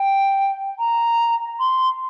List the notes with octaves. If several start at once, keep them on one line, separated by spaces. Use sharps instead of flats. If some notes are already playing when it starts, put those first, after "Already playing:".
Already playing: G5
A#5
C6